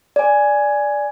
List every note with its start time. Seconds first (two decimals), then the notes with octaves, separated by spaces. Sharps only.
0.16 D5 G#5